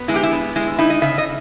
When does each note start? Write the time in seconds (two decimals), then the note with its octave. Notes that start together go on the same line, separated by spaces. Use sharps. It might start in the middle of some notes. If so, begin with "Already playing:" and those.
Already playing: B3
0.08 G#3 E4
0.16 G4
0.23 E4
0.32 B3
0.56 G#3 E4
0.78 D#4 E4
0.90 D#5
1.02 C#3 E5
1.18 D#5